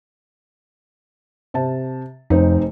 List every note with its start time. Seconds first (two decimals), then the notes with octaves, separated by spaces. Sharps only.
1.54 C3 A5
2.30 F1 F2 C4 D#4